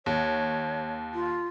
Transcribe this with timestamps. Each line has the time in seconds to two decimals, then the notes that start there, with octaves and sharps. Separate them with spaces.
0.06 D#2 C#5
1.14 F4